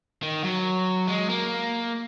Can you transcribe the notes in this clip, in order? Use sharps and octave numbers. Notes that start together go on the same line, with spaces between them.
D#3
F#3
G#3
A#3